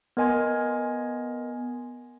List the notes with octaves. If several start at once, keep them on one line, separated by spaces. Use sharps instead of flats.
B3 A#4 D#5 G#5 C6 G#6